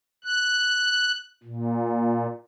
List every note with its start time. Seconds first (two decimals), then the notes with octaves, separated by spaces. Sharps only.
0.24 F#6
1.43 A#2